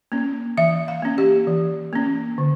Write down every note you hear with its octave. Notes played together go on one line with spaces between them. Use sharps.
A#3 C#4
E3 E5
F5
A#3 C#4
G4
E3
A#3 C#4
D3